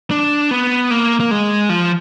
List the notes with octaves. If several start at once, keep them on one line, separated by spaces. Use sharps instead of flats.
D4
B3
A#3
A#3
G#3
F3